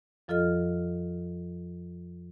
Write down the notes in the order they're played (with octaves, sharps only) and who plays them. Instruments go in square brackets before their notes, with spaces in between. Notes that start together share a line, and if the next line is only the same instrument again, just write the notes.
[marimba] F2 F3 F4 A4 D#5 F6